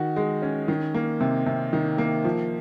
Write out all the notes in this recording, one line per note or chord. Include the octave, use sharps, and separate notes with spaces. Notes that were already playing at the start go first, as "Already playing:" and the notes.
Already playing: D#3 F#4
G#3
C#4
D#3
A#3
C3
C3
D#3
A#3
F3